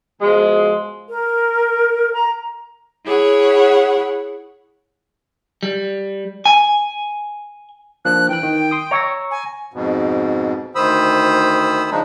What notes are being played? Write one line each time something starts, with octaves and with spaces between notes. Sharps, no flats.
B2 F3 G#3
A#4
A#5
E4 G#4 C#5 F#5
G3
G#5
F3 A#3 D4 F#6
E3 G5 F#6
D#3
C6 D#6
C#5 A#5 E6 A#6
G#5
F2 G#2 B2
D2 D#3 C5 B5 D#6 E6
C#3 F3 G#3 D4 D#4